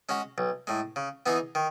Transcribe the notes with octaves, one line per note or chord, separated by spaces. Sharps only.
G#3 C#4 F#4
B1
A2 G#3
C#3
E3 B3 D#4 G#4
D#3